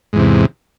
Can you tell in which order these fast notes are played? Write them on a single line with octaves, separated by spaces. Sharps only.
G#2 E2 C3